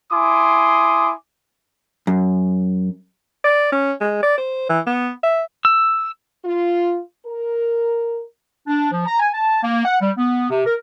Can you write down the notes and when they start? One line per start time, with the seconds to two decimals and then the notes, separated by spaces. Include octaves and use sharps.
0.12 E4 G#5 C6 D6 D#6
2.07 F#2
3.44 D5
3.72 C#4
4.01 G#3
4.23 D5
4.38 C5
4.69 E3
4.87 B3
5.24 E5
5.65 E6
6.45 F4
7.26 A#4
8.67 D4
8.91 F3
9.06 A#5
9.20 G#5
9.34 A5
9.63 A#3
9.85 F#5
10.00 G3
10.17 B3
10.50 C3
10.65 A#4